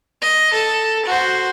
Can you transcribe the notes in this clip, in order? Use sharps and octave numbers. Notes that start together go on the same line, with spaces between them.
D#5
A4
F#4 C5